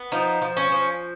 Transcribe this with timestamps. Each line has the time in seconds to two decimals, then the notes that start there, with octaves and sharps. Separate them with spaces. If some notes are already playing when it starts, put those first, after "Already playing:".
Already playing: B3
0.12 F3 D#4
0.42 F3
0.57 C#4
0.72 F3